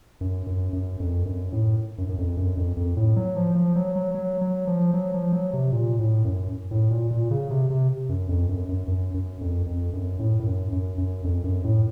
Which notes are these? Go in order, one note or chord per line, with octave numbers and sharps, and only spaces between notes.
F#2
F#2
F#2
F2
F#2
A2
F#2
F#2
F2
F#2
F2
F2
A2
F#3
F3
F3
F#3
F#3
F#3
F#3
F3
F#3
F3
F#3
C3
A#2
A2
F#2
A2
A#2
A#2
C#3
C3
C3
F#2
F2
F#2
F#2
F#2
F#2
F2
F2
F#2
A2
A2
F#2
F#2
F#2
F2
F#2
A2